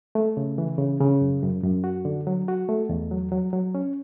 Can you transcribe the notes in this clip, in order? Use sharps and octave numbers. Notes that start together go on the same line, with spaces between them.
A3
C#3
E3
C#3
C#3
F#2
F#2
F#2
F#4
D3
F#3
F#4
A3
E2
F#3
F#3
F#3
C#4